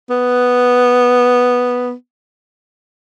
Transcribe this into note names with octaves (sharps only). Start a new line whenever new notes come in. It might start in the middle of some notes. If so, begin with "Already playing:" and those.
B3